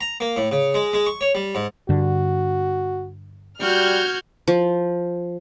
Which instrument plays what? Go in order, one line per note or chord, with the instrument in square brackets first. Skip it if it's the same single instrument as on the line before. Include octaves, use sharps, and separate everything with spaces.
[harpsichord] A#5
A#3
A2
C#3
G#3
G#3
C#6
C#5
G3
G#2
[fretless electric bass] G2 D3 [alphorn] F#4
[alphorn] G3 [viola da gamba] F#4 [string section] F6 G6 G#6
[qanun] F3